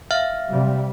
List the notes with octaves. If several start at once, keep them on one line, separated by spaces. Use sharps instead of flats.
E5 F5 F6
C3 G3